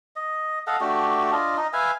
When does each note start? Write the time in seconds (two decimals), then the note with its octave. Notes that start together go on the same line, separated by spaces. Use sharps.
0.16 D#5
0.67 A4 D#5 F5 F#5
0.81 A3 D4 F#4 G4
1.32 D4 F4 D#5
1.57 D#4 D#5
1.73 B4 E5 F5 G#5